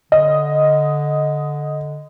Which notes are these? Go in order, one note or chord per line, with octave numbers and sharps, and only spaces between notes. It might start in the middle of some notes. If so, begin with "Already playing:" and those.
D3 D#5